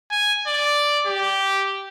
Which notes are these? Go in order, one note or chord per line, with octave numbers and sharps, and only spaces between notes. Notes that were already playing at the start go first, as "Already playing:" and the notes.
G#5
D5
G4